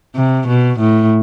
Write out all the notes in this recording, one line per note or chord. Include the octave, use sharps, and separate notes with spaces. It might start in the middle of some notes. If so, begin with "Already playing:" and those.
C3
B2
A2